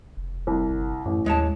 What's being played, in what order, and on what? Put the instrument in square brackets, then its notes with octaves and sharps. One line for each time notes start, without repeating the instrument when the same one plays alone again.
[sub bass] F1
[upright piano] C2
[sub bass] G1
[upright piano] A1 [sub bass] F#2
[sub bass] D#2 [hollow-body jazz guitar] G#3 C#5 A5